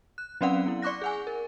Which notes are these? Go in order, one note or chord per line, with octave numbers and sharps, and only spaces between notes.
F#6
F#3 C4 C#4 D5 F5 F#5
B3 E4
D5 C#6 D6 F#6 A#6
G#4 F#5 G#5
A#4